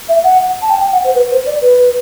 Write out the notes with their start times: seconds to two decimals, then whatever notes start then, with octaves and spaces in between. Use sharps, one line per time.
0.08 E5
0.23 F#5
0.61 A5
0.69 G5
0.80 G5
0.92 F#5
1.04 C5
1.14 B4
1.30 C5
1.46 D5
1.61 B4